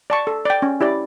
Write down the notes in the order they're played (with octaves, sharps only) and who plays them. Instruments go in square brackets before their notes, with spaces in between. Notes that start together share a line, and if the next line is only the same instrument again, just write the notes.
[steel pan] D5 A5 C#6
A4
D5 G5
C#4
E4 G4 D5